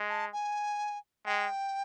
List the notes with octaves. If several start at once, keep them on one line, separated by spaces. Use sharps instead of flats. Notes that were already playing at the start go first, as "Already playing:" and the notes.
Already playing: G#3
A5
G#5
G#3 G5